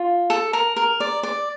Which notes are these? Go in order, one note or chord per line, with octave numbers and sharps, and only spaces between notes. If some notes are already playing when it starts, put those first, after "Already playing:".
Already playing: F4
A4
A#4
A#4
D5
D5